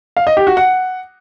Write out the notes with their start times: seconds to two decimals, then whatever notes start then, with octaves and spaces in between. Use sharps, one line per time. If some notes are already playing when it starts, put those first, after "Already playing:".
0.17 F5
0.27 D#5
0.37 G4
0.47 F#4
0.57 F#5